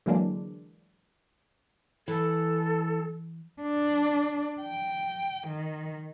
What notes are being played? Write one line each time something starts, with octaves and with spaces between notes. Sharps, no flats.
D3 E3 F#3 G#3 A#3 D4
E3 A4
D4
G5
D#3